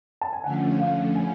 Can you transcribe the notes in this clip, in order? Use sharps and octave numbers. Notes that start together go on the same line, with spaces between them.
A5
G#5
D3 F3 A3 C#4 F#5
F5
G#5